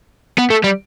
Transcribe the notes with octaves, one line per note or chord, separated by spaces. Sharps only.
B3
A3
G3